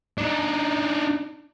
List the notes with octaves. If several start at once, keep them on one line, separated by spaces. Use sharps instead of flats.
D4 D#4